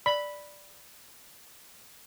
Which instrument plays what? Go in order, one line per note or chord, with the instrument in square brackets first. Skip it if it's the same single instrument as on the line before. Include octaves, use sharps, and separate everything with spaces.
[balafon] D5 [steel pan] B5